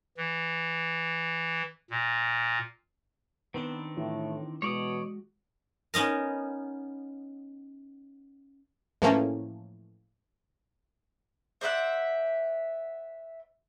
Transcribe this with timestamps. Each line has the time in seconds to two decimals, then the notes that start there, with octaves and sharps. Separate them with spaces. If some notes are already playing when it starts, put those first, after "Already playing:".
0.17 E3
1.90 A#2
3.54 D#3 B3 C4 D4 B4
3.97 A2 E3 F4
4.62 B2 G#3 F#4 C#5 D5 D#6
5.94 B3 C#4 D#4 A#4
9.02 A2 E3 F3 A3 A#3 C#4
11.61 C5 D5 E5 F#5